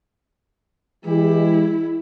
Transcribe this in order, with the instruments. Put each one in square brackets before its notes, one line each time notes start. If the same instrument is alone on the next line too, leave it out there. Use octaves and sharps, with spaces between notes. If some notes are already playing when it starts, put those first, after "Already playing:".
[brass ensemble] E3 G#3 G4 [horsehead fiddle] E4